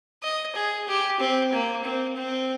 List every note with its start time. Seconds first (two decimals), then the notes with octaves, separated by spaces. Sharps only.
0.23 D#5
0.55 G#4
0.88 G4
1.20 C4
1.52 A#3
1.84 C4
2.16 C4